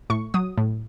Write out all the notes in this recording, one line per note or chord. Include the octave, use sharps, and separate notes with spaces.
A2 C#6
F#3 D#6
A2